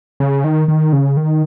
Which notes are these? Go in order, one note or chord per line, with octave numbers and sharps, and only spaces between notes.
C#3
D#3
D#3
C#3
D#3